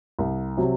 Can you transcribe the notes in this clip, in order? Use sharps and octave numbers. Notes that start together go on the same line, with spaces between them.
C2
C3 F#3